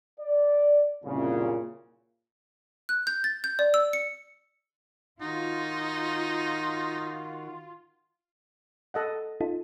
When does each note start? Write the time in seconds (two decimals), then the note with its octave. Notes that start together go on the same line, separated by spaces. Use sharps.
0.20 D5
1.04 C2 F#2 A#2 C#3
2.89 F#6
3.07 G6
3.24 A6
3.44 G6
3.59 D5
3.74 E6
3.93 C#7
5.21 D#3 D#4 F4 F#4
8.94 A4 D#5 F#5
9.41 D#4 F4 A4